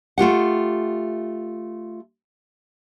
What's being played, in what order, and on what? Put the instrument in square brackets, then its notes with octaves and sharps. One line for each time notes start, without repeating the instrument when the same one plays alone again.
[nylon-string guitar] A3 F4 G4 F#5